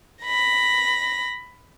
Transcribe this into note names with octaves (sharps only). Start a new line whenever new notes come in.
B5 A#6